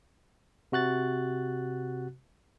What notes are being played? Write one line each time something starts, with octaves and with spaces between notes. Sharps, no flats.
C3 F#4 F#6 A6